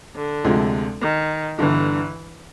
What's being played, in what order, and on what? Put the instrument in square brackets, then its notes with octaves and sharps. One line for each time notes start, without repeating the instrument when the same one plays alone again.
[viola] D3
[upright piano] D2 C3 F3 G#3
[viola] D#3
[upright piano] G1 G2 D3 [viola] E3